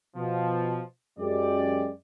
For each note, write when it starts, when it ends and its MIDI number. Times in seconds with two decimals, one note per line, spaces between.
0.17 0.82 47
0.17 0.82 53
1.19 1.91 42
1.19 1.91 56
1.19 1.91 67
1.19 1.91 74